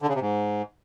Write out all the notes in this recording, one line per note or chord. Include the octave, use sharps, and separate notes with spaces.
D3
C#3
C3
G#2